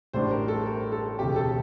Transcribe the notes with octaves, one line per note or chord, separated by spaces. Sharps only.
A1 A2 G3 D4 C5
A#4
A4
A#4
A4
E1 D2 C3 G4
A4